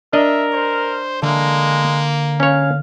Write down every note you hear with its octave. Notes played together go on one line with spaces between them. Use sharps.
D4 A#4 D#5 E5
C5
D3 G#3 A#3
C#4 C#5 F5